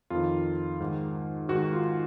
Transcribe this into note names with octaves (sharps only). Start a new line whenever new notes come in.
F2 D#3 F4
G#2 D#3
G#2 D#3 F#4
F4